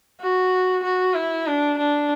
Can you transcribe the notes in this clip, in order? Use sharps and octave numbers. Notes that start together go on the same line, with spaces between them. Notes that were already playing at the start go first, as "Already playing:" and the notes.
F#4
F#4
E4
D4
D4